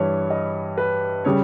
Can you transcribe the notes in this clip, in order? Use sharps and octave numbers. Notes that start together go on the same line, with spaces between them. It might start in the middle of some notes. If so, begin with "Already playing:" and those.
Already playing: G2 E3 G3 B4 C#5
D#5
B4
C#3 G3 C#5